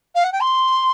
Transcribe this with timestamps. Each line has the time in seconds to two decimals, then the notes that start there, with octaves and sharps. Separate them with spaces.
0.15 F5
0.24 F#5
0.32 G5
0.41 C6